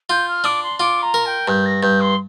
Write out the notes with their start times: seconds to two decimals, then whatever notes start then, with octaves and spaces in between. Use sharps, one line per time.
0.10 F4 G6
0.27 F6
0.44 D4 D6
0.62 C6
0.79 F4 D6
1.02 A#5
1.14 A#4
1.25 G5
1.47 G2 G6
1.65 A#6
1.82 G2 G6
2.00 C6